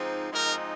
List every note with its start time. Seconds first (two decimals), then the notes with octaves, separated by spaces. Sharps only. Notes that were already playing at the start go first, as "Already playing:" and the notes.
Already playing: G#2 F3 C4 D#4
0.31 G#2 F3 G#3 C4 D#4 A#4